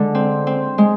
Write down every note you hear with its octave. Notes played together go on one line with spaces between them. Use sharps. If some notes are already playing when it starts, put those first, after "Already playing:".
Already playing: D3 G#3
C4
C4
G#3